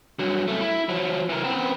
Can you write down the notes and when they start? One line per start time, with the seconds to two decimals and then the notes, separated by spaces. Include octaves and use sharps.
0.19 G2 F#3
0.48 C2 A3
0.61 E4
0.89 F3 F#3
1.29 E3 A#4
1.44 B3 C4